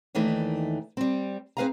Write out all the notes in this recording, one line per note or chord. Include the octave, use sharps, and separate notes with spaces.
D#2 D#3 E3 A3 D4
G3 C4
C4 G#4 B4 F5 G#5 A#5